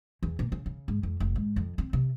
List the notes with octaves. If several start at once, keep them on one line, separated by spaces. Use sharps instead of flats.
E2
A#2
C#3
C#3
G#2
F2
F1
G#2
F2
C4
C3